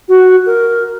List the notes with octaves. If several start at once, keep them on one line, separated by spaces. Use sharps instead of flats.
F#4
A#4